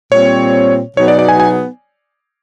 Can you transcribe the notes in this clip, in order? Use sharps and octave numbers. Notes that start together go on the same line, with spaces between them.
A#2 G3 C4 C#5
B2 F#3 B3 D#4 G#4 C#5
D5
D5
G#5
G#5